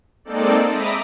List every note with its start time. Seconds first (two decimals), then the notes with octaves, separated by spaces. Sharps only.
0.25 G#3 A#3 C4 D#4 A4 D5
0.69 D#5 E5 A#5 B5 D6 D#6